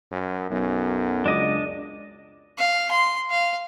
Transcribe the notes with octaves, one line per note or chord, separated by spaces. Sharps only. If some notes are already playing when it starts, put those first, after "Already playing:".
F#2
B1 F#2
C#2 D4 D#5 D6
F5
C6
F5